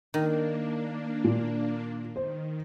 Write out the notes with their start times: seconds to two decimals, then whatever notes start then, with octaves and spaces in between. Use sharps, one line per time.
0.14 D#3 A#3 D4
1.24 A#2
2.16 D#3 C5